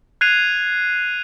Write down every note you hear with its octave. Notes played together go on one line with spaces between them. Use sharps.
F#6 G#6 C7 D#7 F7